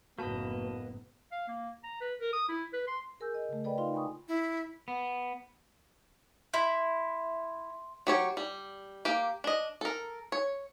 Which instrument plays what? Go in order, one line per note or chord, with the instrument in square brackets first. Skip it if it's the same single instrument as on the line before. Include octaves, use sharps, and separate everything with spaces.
[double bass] F#1 A2 [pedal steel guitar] A#3 B4 D#5 [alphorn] B3 [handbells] F#4 A5
[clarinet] F5
A#3
A#5
B4
A#4
D#6
E4
B4
C6
[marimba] G#4 A#4 G#5 E6 G6
D#5
C#3 A3
A4 B4 D5 D#5 G5 B5
D#4 F4 F5 C6
G5 G#5 B5 C#6 D#6
[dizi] E4
[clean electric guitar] B3
[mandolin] E4 [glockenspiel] C6
[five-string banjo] F#3 G4 C#5
G3
A#3 G4
D4 D#5
A4 A#4
C#5